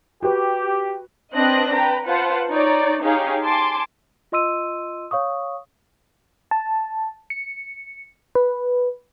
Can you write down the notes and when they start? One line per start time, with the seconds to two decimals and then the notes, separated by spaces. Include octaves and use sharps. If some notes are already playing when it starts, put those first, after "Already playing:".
0.22 F#4 G4 B4
1.34 C4 D4 B4 D#5 F#6 A#6
1.74 B4 G5 A#5
2.07 F4 B4 C5 F#5 A5
2.49 D#4 C#5 D5
3.02 D#4 G4 G#4 C#5 F5
3.44 G#5 A5 C6 D6
4.32 F4 D#5 C6 E6 D#7
5.11 C#5 F5 C#6 D#6
6.51 A5
7.30 C#7
8.35 B4